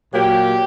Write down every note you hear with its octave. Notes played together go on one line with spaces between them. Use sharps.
A#2 F#3 A#3 G4